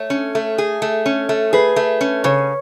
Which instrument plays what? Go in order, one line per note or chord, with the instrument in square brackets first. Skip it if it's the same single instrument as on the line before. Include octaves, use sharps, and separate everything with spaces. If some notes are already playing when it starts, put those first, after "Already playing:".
Already playing: [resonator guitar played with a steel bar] A3 [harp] C#5
[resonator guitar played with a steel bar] C#4
A3
G#4
A3
C#4
A3
[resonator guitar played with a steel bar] G#4 [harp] B4
[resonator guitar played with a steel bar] A3
C#4
[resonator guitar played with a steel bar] C#3 [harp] C#5